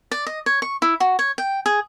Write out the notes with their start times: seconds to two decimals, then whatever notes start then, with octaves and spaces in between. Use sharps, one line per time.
0.11 D5
0.27 D#5
0.46 C#5
0.62 C#6
0.82 E4
1.00 F#4
1.19 C#5
1.38 G5
1.66 G#4